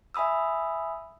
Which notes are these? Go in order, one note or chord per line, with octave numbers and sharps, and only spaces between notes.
E5 G#5 B5 D#6 E6